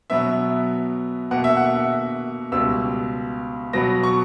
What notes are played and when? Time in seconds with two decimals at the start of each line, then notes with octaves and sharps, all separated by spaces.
0.10 B2 F#3 B3 E5
1.31 B2 A#3 F#5
1.44 E5
1.57 F#5
2.52 C#2 B2 G3 E6
3.73 B2 F#3 B3 A#6
4.03 C#6